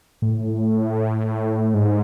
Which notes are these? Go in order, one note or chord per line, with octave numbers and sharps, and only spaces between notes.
A2
G#2